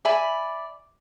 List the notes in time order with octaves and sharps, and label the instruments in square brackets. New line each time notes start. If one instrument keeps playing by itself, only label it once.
[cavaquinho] D5 E5 G#5 B5